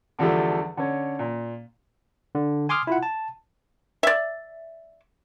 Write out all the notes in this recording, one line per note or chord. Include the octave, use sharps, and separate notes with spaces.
E2 D3 F3 G3 A3
D3 C#4
A#2
D3
G#5 C6 D6 D#6 F6
E4 F4 F#5
A5
D5 E5